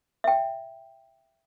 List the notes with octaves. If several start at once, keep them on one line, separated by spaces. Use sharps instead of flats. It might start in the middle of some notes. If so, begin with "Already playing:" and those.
E5 G5